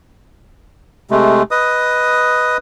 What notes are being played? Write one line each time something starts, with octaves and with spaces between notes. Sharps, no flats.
C3 G#3 A3
B4 D#5 D#6